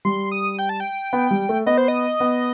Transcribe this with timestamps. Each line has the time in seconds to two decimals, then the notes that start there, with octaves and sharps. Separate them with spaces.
0.05 G3 C6
0.32 D#6
0.59 G5
0.69 A5
0.80 G5
1.13 B3
1.31 G3
1.49 A3
1.66 B3 D#5
1.78 C5
1.88 D#5
2.20 B3